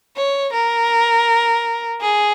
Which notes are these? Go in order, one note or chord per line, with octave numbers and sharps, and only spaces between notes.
C#5
A#4
G#4